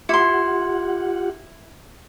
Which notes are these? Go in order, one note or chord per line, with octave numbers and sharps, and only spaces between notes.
E4 F4 G4 F#5 C6